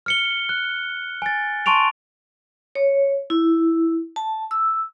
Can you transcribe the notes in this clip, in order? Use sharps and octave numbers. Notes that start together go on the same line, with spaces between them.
F6 C#7 G7
F#6
G#5 A6
A5 C6 C#6 D7 F7
C#5
E4
A5
E6